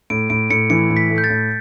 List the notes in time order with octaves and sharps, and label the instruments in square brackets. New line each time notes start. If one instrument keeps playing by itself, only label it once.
[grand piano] A2 [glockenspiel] D7
[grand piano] A2 [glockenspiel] D7
[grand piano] A2 [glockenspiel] C#7
[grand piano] E3 [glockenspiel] C#7
[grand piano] A2
[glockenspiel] B6
[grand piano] A3
[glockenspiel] G6
A6
[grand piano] A2